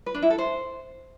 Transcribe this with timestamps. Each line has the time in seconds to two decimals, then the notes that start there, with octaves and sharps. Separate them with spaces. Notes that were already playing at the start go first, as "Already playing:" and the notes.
0.06 B4
0.14 D4
0.22 E4
0.30 A4
0.38 C5